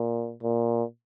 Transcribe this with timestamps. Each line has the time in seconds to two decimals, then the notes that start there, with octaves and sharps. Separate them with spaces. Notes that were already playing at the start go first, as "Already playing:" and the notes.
Already playing: A#2
0.43 A#2